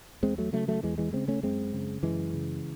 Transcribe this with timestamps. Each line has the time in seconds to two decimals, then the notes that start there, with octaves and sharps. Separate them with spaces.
0.22 E2 G#3 C4
0.38 F#3 A3
0.52 C#3 F#3 A3
0.68 F#3 A3
0.83 E2 E3 G#3
0.98 E3 G#3
1.13 C#3 G#3 C4
1.28 A3 C#4
1.43 F#2 G#3 C4
1.73 C#3
2.03 F#2 E3 G#3
2.34 C#3